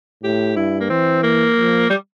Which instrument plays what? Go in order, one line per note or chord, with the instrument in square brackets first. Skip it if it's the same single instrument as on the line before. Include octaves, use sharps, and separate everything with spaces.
[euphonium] A2 [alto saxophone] G4
[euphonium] G2 [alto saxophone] E4
[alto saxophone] A#3
[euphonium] E3 [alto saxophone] C4
[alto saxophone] A#3
[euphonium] F3
[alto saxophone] G3